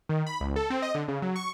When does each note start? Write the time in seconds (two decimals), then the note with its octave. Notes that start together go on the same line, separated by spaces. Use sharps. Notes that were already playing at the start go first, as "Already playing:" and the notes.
0.09 D#3
0.27 B5
0.40 C#2
0.56 A4
0.70 C4
0.82 D#5
0.95 D3
1.08 C#3
1.22 F#3
1.36 C#6